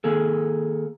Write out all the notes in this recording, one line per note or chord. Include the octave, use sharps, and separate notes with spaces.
D#3 A#3 G#4 A4